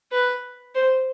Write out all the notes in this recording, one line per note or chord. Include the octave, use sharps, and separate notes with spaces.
B4
C5